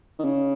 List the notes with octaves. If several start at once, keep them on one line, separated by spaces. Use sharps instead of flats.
D#3
C#3